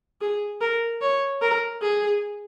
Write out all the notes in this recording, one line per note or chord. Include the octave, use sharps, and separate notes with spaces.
G#4
A#4
C#5
A#4
G#4